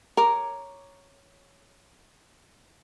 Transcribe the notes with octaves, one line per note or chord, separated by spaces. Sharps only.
A#4 C#5 A#5 D6